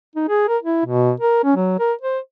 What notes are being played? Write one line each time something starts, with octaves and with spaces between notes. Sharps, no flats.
D#4
G#4
A#4
E4
B2
A#4
C#4
F#3
A#4
C5